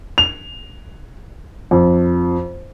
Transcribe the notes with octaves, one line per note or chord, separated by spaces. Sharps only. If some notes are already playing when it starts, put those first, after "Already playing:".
F7
F2